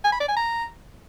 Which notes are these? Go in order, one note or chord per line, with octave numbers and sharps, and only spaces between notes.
G#5
B5
D5
G#5
A#5